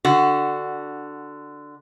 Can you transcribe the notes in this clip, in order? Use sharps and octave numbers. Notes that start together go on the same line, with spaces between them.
D3 F#4